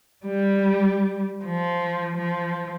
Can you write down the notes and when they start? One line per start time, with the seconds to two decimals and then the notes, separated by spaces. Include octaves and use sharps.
0.25 G3
1.44 F3
2.17 F3